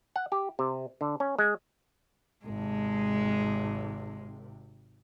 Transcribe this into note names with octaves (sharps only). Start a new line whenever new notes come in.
F#5
G4
C3
D3
C#4
G#3
G#1 C3 G#3